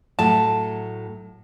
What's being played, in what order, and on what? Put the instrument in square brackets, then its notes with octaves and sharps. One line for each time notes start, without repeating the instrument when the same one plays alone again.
[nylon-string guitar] A2 F#3 A3 [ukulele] A5